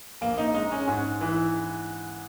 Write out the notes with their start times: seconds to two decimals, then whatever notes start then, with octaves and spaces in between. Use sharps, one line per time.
0.21 A#1 A#3
0.38 D#4
0.54 G#3 D#4
0.72 C#4
0.87 G#2 C#4
1.21 E3
1.32 E4